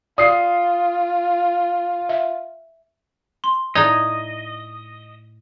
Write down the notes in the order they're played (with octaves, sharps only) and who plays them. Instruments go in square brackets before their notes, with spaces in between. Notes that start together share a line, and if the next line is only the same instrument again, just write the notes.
[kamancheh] F4 [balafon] D5 [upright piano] D#6 C7
[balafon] E5
[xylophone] C6
[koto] A2 D#4 [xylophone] D5 A#5 G#6 [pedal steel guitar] D#5